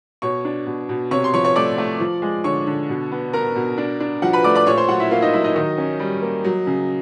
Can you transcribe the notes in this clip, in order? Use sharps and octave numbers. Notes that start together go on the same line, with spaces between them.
B2 C#5 C#6
D4
B2
B2
C3 C#5 C#6
C6
F3 C#5 C#6
C#5 C#6
A3 D5 D6
A3
F3
G#3
D3 C#5 C#6
D3
B2
B3
B3 A#4 A#5
B2
D4
D4
F3 F#4 F#5
B4 B5
A3 D5 D6
D5 D6
A#2 C#5 C#6
C5 C6
F#3 F#4 F#5
E4 E5
A#3 F4 F5
D#4 D#5
F#3 E4 E5
D#4 D#5
D#3 D#4 D#5
C#4
G3
A#3
F#3
C#3